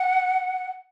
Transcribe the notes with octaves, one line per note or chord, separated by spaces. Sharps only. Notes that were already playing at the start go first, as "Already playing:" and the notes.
Already playing: F#5